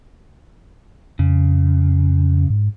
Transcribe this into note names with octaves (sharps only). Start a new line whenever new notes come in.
F2 C#3
G#2